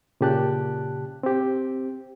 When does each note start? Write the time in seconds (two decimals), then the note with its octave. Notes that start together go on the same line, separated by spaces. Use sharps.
0.21 A#2 C#3 G4 A5 F#6
1.23 C4 G4